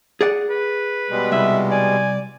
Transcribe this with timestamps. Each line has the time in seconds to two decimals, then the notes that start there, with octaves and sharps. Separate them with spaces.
0.21 G#4 D5 F#5
0.50 B4
1.10 B2 G3 G#3
1.32 C2 E5
1.71 D5 G#5